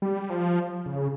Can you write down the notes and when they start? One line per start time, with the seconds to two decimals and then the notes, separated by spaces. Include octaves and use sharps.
0.02 G3
0.30 F3
0.86 C#3